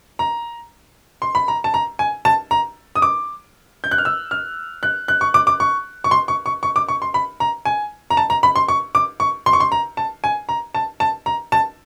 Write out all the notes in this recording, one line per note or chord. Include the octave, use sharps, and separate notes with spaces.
A#5
C6
B5
A#5
A5
A#5
G#5
A5
A#5
D#6
D6
G6
F#6
F6
E6
F6
F#6
F#6
C#6
D6
D6
C#6
C#6
C6
C#6
C#6
C#6
D6
C#6
C6
B5
A#5
G#5
A#5
A5
A#5
B5
C6
C#6
D6
C#6
C6
C#6
C6
A#5
A5
G#5
A#5
A5
A5
A#5
A5